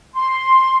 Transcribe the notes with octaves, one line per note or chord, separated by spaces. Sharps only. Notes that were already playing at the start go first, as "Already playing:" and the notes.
C6